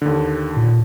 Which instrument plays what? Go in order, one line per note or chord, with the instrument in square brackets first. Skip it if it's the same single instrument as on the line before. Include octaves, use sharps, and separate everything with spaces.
[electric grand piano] D#2 D3
[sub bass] A#2